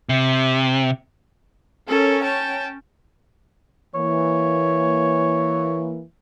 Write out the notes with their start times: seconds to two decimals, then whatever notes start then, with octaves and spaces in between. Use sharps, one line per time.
0.09 C3
1.89 C#4 A4 A#4
2.23 G5 A5
3.95 E3 A#3 C#5